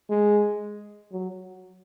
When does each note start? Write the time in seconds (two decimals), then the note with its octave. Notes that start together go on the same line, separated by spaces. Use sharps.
0.10 G#3
1.12 F#3